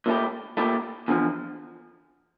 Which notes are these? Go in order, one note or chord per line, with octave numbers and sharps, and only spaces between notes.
A#2 A3 E4 G4
A#2 A3 E4 G4
E2 D3 F3